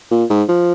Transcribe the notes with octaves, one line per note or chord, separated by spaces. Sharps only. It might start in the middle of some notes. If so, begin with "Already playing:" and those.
A#2
G#2
F3